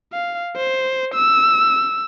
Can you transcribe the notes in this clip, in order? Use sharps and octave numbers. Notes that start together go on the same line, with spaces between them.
F5
C5
E6